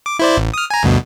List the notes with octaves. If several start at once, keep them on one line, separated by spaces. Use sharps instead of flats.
D6
E4 C5 D5
A1
D#6 F6
G#5 A#5
D2 G2 B2